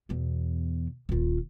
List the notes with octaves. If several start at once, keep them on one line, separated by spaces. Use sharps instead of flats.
E2 B2
D#1 F4